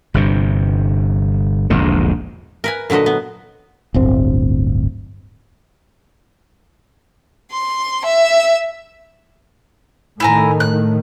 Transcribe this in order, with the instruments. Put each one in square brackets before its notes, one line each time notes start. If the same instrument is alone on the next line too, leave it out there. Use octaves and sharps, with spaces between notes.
[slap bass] G1 G2 C3
E1 A#1 G#2 D3
[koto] A#4 B4 G#5
A#2 D3 F#3 B4 D#5
B3
[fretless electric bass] D1 G1 C4
[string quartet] C6
E5
[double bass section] A2 D#3 A3 [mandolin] E4 G#5 A#5
[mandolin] F#6